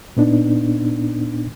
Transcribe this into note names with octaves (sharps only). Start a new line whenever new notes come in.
A#2 B3 D4 D#4